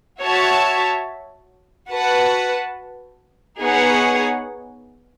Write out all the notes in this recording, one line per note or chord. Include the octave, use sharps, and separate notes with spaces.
F#4 C#5 E5 A5
F#4 B4 F#5 A5
B3 D#4 G#4 C#5 F#5